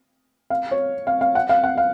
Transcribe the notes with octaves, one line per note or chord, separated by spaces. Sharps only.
F5
C#5
F5
F5
F#5
F5
F#5
F5